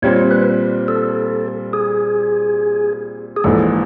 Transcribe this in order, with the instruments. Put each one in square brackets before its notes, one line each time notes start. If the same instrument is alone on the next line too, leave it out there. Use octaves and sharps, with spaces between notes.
[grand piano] A#2 G3 C4 [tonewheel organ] C#5
[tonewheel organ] B4
A4
G#4
G#4
[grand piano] A#1 G#2 E3 [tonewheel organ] A4